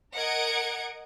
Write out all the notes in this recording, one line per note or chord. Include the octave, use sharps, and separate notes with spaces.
A#4 D#5 F#5 G#6 C#7 D7